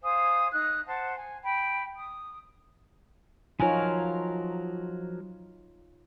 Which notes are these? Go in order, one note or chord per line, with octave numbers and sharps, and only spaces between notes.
C5 F5 G#5 D#6
D#4 D#6 F#6
C5 F#5 A5
G#5
G5 B5
D#6
F3 F#3 D#4 F4 A#4 C#5 G#5